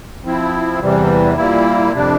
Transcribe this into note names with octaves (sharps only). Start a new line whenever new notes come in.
F3 C4 E4
E2 C3 E3 G3
A#2 G3 A#3 E4
F2 C3 G3 D4